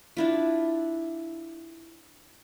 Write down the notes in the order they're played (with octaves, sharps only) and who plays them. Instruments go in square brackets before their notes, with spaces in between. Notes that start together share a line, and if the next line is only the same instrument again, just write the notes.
[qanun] D4 E4 F4